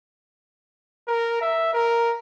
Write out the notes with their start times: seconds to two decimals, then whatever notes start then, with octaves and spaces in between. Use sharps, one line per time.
1.07 A#4
1.41 E5
1.73 A#4